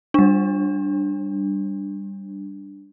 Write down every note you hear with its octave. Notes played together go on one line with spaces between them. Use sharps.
G3 D4